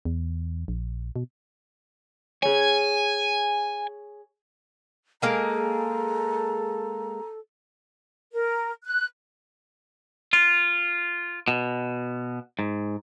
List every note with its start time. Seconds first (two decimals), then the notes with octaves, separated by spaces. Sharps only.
0.05 E2
0.68 A#1
1.16 B2
2.43 G#4 C#5 G#5
5.22 G#3 A#3 G#4 A4 A#5
8.33 A#4
8.84 F#6
10.33 F4
11.48 B2
12.59 G#2